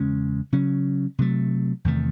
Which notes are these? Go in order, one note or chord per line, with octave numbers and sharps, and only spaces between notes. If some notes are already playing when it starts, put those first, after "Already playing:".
Already playing: E2 C#3 G#3 C#4
C#3 F#3 C#4
C3 F#3 A3
E2 C3 D#3 A3